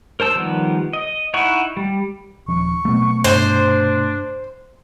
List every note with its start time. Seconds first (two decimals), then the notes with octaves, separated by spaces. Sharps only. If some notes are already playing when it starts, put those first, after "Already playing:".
0.20 A#4 C5 A5 E6
0.36 D#3 F3 G3 B3
0.93 D#5
1.34 D#4 E4 F#5 C#6
1.77 G3
2.48 D#1 F3 C#4 C#6
2.85 B2 F#3 A3 B3 C4
3.24 G2 C3 D4 C5